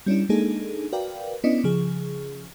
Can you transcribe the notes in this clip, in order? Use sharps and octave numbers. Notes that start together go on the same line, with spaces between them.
G3 C#4 D4 E4
G#3 A#3 D4 D#4 G#4 A4
F#4 A#4 B4 D5 F5 G5
B3 C#4 D4 E4 D5 D#5
C#3 F3 G#4